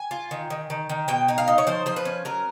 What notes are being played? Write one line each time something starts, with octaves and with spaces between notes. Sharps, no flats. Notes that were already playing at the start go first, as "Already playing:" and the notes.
Already playing: G#5
F4
D#3
D#3
D#3
D#3
B2 G5
D#4
F5
D#4
C#5
F3 C5
F3 C5
B4
C#4
F#3 A#4